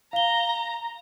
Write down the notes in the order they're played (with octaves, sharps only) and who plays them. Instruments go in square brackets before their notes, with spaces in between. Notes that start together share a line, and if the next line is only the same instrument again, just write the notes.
[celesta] F5 G7 [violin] A#5